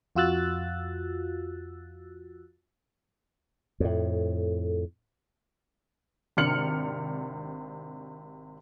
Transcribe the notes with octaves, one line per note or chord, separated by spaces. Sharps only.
F2 F4 F#4 E6 F#6 A6
F2 A2
G#1 C3 D4 F6 C#7 F#7